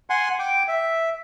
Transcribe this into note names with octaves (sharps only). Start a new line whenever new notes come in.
F#5 G#5 C6
G5 D6
E5